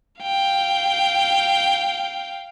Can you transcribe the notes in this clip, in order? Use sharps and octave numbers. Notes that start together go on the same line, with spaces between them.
F5 G5